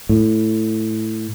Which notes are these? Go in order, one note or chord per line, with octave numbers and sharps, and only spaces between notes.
A2